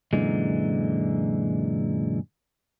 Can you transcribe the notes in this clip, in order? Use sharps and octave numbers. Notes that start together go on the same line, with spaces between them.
F#2 A#2 D3 E3 G#3